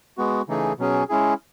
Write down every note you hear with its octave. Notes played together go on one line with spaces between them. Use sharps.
G#3 B3 F#4
C#3 E3 A3 D#4 G#4
B2 F#3 C#4 G#4
G#3 C#4 E4 G#4